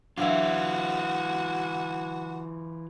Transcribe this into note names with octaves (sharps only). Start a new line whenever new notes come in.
E3 F#3 D4 F4 F#4 C#5 E5 F5